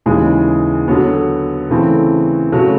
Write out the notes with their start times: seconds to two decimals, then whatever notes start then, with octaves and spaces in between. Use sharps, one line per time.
0.06 D#2 C#3 E3 G#3
0.88 D3 F#3 B3
1.70 C#3 E3 A3 C4
2.52 C#3 F#3 A3